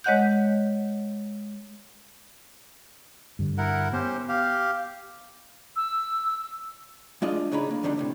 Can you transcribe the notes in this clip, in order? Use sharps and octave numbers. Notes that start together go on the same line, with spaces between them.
G#3 C#5 D#5 F#5 F#6 G6
G2 D3
E4 A#4 F#5
B3 C#4 G4 C5
G4 F5
E6
G#3 D4 F4 D5 D#5
A2 C#3 D4 D#4 C#5 B5
A#3
E2 G2 D3 D#3 G3 D4
E2 A2 C3